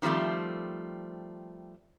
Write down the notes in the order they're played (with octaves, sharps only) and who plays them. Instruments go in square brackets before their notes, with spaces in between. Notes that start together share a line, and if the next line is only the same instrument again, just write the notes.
[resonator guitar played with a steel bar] D#3 F3 G3 A3 C4